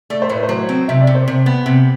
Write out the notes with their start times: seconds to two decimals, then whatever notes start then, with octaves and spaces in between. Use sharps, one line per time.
0.10 A3 D5
0.22 C5
0.29 A2 B4
0.43 C5
0.49 F#3
0.69 C4
0.88 C3 E5
1.01 D5
1.07 C3
1.15 C5
1.28 C3
1.46 B3
1.66 C3